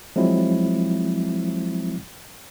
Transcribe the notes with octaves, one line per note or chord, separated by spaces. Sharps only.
F3 F#3 G#3 C4 E4